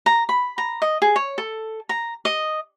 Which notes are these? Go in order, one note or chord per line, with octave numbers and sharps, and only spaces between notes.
A#5
B5
A#5
D#5
G#4
C#5
A4
A#5
D#5